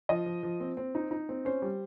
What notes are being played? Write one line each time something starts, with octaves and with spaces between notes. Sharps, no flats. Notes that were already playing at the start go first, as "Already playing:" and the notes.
F3 D#5
F3
F3
C4
C4
D#4
D#4
C4
C#4 C5
G3